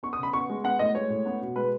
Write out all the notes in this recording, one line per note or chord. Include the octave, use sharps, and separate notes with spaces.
B3 C#6
D#6
C#3 B5
B3 C#6
G#3
B3 F#5
A2 D#5
G#3 C#5
A2
B3
B2
G#3 B4